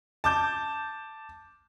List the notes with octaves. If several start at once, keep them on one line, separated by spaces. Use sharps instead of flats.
A5 D6 G6